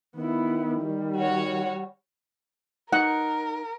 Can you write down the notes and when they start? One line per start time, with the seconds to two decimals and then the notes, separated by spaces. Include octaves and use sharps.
0.16 D#3 B3 E4
0.82 G3
1.18 F#4 C#5
2.92 D#4 A#4 F#5